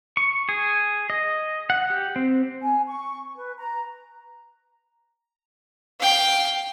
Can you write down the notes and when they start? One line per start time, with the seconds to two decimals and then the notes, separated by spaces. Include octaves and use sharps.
0.17 C#6
0.49 G#4
1.10 D#5
1.70 F#5
1.90 G4
2.16 C4
2.63 G#5
2.88 C#6
3.36 B4
3.57 A#5
6.00 F5 G5